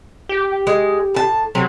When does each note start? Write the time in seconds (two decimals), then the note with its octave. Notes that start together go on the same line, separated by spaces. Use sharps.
0.29 G4
0.67 G#3
1.14 A2 A5
1.55 C3 F#3